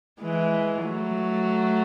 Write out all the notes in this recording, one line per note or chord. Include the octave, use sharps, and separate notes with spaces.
E3 G#3
F#3 A3